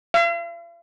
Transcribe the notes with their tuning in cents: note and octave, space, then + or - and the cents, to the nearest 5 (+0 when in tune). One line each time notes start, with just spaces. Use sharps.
F5 -45